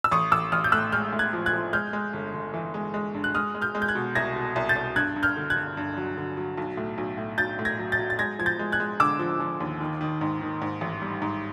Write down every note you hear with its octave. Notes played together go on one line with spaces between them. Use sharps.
E6
A1 C#6 D#6
A1 D6 E6
A1 D#6 F6
G6
A2 E6 F#6
G#3 F6 G6
A2
F#6 G#6
F3
F#6 G#6
F3
G#3 F6 G6
G#3
G1
G1
E3
G#3
G#3
G2
F#6
G#3 D#6 F6
G#3
F6 G6
G#3
G6
F#6 G#6
B2
C2 G#6 A#6
B2
C2
G6 A6
C2
G2 F#6 G#6
G2
F6 G6
D3
F#6 G#6
G2
G2
F#3
D3
F#3
B1
A2
B1
A2
B1 G6 A6
A2
G#6 A#6
F#3
G6 A6
F#3
A6
G#3 G#6 A#6
F3 G#6
G6 A6
G#3
F#6 G#6
G#3
D3 D6 E6
F3
F3
D#2
D#3
D#3
G#2
D#3
G#2
A1
G3
G#2